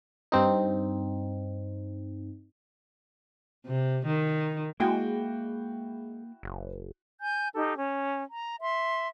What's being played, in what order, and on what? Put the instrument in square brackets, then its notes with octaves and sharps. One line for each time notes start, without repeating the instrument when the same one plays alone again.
[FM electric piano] G2 C4 D#4
[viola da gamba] C3
D#3
[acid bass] G#3 [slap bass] A#3 [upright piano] E4 F#4 G5
[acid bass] F#1
[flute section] G#5 G6
D#4 G4 A4
C#4
A#5
E5 C6